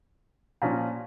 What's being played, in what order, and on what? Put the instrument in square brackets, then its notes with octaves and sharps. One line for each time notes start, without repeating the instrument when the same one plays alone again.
[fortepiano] A#2 F3 C#4